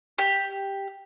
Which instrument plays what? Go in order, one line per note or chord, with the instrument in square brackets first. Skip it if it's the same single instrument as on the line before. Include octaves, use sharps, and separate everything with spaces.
[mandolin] G4